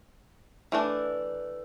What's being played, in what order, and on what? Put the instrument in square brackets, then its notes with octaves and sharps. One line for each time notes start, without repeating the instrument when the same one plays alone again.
[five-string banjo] E3 A3 D4